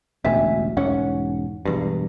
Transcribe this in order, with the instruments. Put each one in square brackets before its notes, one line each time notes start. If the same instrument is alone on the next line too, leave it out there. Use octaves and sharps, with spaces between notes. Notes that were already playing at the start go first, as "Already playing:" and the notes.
[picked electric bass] E1 A1 D2 [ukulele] E5 G#5
[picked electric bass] E1 G#2 C#4 [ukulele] F#5
[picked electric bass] E1 E2 G2